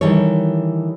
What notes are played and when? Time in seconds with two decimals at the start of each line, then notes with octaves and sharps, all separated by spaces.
0.01 D#3 E3 G3 A4 C#5